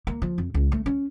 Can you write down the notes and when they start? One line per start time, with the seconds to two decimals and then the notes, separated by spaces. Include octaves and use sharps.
0.07 A#3
0.22 F3
0.38 F2
0.54 C#2
0.72 A3
0.86 C#4